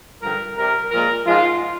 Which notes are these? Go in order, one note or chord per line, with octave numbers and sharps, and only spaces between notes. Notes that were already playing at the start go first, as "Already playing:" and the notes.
G2 D3 F3 A#4
C3 G3 A#4
A#2 F3 G#3 A#4
G#2 F3 G#3 F4